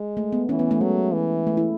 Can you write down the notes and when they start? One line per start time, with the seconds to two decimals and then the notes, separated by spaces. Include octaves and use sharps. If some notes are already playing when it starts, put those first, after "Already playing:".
Already playing: G#3
0.17 A3
0.33 B3
0.49 E3 C#4
0.59 B3
0.71 A3
0.81 F#3 G#3
1.13 E3
1.47 A3
1.57 E4